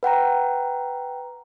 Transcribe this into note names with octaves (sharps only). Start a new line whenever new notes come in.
B4 F#5 G5 A#5